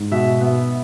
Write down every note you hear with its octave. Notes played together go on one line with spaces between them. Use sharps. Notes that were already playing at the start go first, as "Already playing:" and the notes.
Already playing: G#2
B2 E5
B3 E5